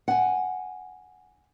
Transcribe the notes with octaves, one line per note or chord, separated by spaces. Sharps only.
F#5 G#5